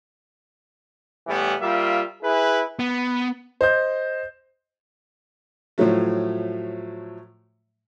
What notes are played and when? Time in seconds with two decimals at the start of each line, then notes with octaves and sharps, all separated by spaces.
1.27 A2 E3 G3 B3
1.60 G3 A#3 F4 E5
2.23 E4 G#4 B4
2.79 B3
3.61 C5 D#5 G6
5.78 A2 F3 F#3 A3